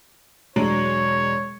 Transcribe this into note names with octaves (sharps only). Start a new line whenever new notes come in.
E1 F#3 G#3 D4 C#5 D7 D#7